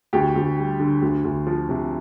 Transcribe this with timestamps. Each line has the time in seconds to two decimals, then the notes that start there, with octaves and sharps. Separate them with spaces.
0.13 D2 G4
0.36 D2
0.58 G3
0.80 D3
1.02 D2
1.24 D2
1.47 F3
1.69 C3